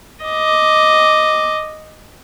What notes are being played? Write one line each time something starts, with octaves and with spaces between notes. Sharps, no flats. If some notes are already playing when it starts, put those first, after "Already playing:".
D#5 D6